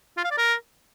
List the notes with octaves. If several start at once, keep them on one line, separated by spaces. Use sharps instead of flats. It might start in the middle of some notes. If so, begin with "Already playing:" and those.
F4
F5
D5
A#4